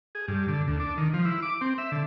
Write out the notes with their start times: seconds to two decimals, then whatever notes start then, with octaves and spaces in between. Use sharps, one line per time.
0.15 G#4
0.28 G2
0.48 D3
0.68 D2
0.80 D4
0.97 D#3
1.14 F3
1.25 E4
1.42 D6
1.61 C4
1.78 E5
1.92 D3